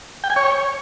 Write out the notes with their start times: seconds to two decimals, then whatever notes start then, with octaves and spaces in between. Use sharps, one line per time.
0.24 G5
0.30 G#5
0.36 C#5